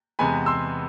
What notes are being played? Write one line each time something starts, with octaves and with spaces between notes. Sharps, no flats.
E2 C3 G#3 B3 G#5 B5
C6 E6